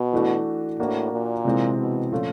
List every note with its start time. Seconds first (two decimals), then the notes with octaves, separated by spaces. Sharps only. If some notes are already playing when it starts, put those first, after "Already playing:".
Already playing: B2
0.13 E3 A3 D4 F#4
0.79 A2 A#3 D4 F#4
1.12 A#2
1.45 C3 E3 G#3 C4
1.78 B2
2.12 A#2 F3 A3 C#4 F4